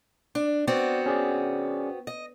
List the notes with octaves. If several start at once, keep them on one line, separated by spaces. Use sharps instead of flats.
D4
B3 C4 F#4 D5
C#4 G#4 D5
D#5